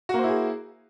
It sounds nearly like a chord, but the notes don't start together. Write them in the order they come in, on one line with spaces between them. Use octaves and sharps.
F#4 A#3 C5 E4 G#4